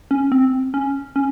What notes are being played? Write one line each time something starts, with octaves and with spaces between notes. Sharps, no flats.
C#4
C4
C#4
C#4